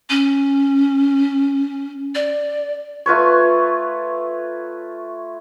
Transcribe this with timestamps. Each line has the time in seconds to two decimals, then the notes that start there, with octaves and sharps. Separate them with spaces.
0.09 C#4
2.15 D5
3.06 A3 F4 B4 C#5